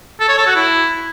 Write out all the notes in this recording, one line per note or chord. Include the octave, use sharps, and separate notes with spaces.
A4
C#5
A4
F#4
E4